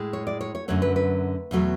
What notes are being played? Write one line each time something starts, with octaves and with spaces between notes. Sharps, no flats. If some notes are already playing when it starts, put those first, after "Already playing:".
Already playing: A2 G#3
C#5
D5
C#5
C#5
F#2 D3 F#3 A3 C#5
B4
B4
E2 B2 F#3 A3